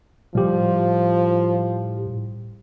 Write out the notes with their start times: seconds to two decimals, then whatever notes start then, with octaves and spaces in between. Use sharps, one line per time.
0.35 A2 F3 G3 G4